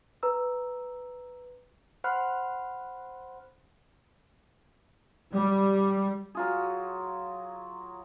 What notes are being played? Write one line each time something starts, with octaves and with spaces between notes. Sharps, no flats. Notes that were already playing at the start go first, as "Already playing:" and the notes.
B4 A#5 E6
C5 F#5 B5 C6 F6 F#6
G3
F#3 F4 G#4